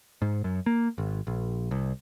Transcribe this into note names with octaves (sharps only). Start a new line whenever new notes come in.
G#2
F#2
A#3
G#1
A#1
C2